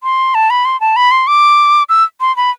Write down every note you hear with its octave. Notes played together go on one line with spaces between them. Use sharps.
C6
A5
B5
C6
A5
B5
C6
D6
E6
C6
B5